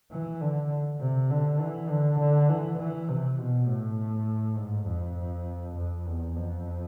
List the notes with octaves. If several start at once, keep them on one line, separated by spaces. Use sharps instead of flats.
E3
D3
C3
D3
E3
D3
D3
E3
E3
C3
B2
A2
G#2
F2
F2
E2
F2